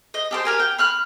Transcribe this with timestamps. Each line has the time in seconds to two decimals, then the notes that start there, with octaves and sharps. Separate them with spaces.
0.14 D#5
0.31 G4 A4 C5
0.45 G4 A#4 G#5
0.60 G5
0.78 B5 F6 F#6